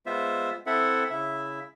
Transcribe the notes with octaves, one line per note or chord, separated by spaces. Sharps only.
G#3 B3 F4 C5 E5
C4 E4 A4 E5 F#5
C#3 E4 E5